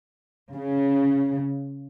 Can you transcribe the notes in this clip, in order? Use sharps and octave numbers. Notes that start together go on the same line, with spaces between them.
C#3